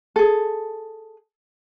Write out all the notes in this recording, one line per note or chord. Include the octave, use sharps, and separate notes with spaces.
G#4 A4